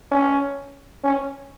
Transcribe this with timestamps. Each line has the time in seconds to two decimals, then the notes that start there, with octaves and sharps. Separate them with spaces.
0.12 C#4
1.04 C#4